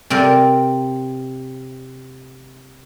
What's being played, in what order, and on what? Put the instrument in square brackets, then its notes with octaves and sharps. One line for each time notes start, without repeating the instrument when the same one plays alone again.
[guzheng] C3 C4 A#4 D5